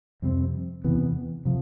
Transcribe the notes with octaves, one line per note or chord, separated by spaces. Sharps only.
F2 C3 G3 C4
E2 C3 E3 B3
C3 F3